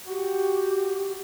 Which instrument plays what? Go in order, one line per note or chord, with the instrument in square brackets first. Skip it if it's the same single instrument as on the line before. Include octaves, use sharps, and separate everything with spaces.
[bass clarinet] F#4 [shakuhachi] G4